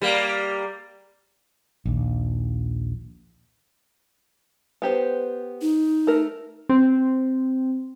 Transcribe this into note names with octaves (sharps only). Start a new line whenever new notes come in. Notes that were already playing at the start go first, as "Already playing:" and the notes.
G3 A#3
A#1 D#2
B3 G4 C5
D#4
A3 A#4
C4